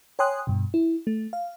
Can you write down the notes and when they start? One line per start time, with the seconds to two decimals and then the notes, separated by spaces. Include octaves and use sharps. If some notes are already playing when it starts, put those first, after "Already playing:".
0.19 C#5 G5 G#5 C6 D#6 F#6
0.47 G2 B2
0.74 E4
1.07 A3
1.33 F5